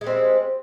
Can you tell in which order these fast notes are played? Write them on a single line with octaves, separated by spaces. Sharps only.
G#3 G3 C4